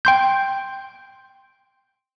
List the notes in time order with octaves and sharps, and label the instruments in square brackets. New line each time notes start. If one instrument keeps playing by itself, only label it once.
[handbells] G5 C6 G6